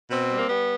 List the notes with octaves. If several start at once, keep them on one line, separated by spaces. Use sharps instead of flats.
B2 C4
G3
A#3
G3 B3